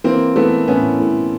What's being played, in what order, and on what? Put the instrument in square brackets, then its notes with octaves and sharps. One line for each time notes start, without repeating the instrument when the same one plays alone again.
[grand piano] E3 [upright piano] A#3 C4
[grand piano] E3 [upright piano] A3 B3
[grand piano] A2 [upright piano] B3 C#4
[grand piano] A2